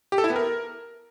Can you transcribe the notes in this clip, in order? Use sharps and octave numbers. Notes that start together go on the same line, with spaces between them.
G4
A4
E4
B3
A#4